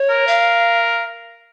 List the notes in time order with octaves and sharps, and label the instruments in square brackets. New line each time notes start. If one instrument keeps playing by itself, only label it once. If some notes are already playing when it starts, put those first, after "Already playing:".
Already playing: [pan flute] C#5
[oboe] A#4
[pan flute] F5